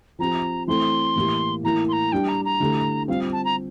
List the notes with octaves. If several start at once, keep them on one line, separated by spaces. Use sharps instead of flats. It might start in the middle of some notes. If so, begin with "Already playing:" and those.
F3 C4 G4 A#5
E3 A3 C4 E4 C6
A2 E3 A#3 E4 G4
A2 E3 A#3 E4 A#5
C6
A#5
G3 D4 G4 G5
A#5
A#5
D3 A3 E4 G4
G3 C4 F4 F5
A5
A#5